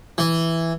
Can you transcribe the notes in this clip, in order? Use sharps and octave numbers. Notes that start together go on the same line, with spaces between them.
E3